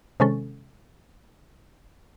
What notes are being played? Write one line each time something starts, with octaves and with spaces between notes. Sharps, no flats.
C3 D#3 G#3 C#4 A4